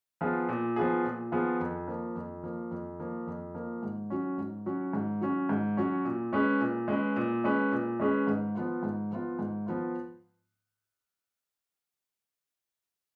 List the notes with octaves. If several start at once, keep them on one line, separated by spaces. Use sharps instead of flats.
F3 B3 F4 G#4
A#2
F3 B3 F4 G#4
A#2
F3 B3 F4 G#4
F2
F3 A#3
F2
F3 A#3
F2
F3 A#3
F2
F3 A#3
G#2
F#3 C#4
G#2
F#3 C#4
G#2
F#3 C#4
G#2
F#3 C#4
A#2
G#3 C#4 G#4 B4
A#2
G#3 C#4 G#4 B4
A#2
G#3 C#4 G#4 B4
A#2
G#3 C#4 G#4 B4
G#2
F3 B3 F4
G#2
F3 B3 F4
G#2
F3 B3 F4